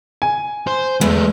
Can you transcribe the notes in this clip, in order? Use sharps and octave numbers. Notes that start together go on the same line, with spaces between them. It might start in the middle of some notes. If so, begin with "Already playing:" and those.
G#5
C5
E2 G#3 A3